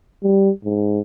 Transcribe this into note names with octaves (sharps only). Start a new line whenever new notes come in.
G3
G#2